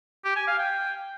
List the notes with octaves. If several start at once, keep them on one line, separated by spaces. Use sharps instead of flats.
G4
G#5
F5
G5